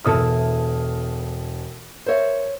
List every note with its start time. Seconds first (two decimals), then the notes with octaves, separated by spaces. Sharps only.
0.05 E1 B3 E4 A4 D#6 F6
2.06 A#4 C5 C#5 E5